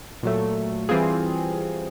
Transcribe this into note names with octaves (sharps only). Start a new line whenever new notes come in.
A#2 F#3 A3
E3 G3 C4 F4 G#4